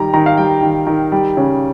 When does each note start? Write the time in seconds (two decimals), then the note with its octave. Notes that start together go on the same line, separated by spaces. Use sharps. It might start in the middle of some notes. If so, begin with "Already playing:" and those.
Already playing: D#3 G3 A#5
0.14 D#3 A#5
0.26 F5
0.37 G3 G5
0.62 D#3
0.87 D#3
1.12 G3
1.37 C#3